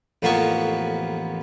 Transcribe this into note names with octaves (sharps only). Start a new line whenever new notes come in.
A1 F2 A#3 B3 C#6